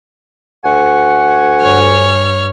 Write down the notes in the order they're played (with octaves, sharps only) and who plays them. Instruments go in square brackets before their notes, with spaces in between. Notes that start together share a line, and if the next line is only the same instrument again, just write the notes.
[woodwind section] D2 G#5 C#6 [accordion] F#5
[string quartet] G2 C#5 F6